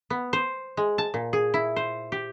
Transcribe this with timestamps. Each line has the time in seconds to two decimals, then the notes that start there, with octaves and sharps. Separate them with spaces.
0.10 B3
0.33 C5
0.77 G#3
0.98 A5
1.14 A#2
1.33 G#4
1.54 E4
1.76 C5
2.12 G4